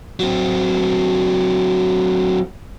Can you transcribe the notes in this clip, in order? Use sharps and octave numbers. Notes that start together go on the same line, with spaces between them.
F#3 C4